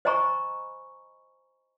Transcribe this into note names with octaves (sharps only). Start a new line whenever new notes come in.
C5 D#5 G#5 A#5 B5 C#6